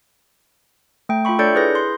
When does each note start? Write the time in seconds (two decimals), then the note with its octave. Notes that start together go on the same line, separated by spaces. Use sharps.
1.09 A3 G5
1.25 F4 E5 G5 B5 C#6
1.39 D4 A4 C#5 D5 G6 C#7
1.55 E4 G#4 B4 G6 A#6
1.75 C6